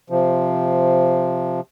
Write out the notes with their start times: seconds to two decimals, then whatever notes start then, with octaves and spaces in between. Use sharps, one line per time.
0.10 C3 F3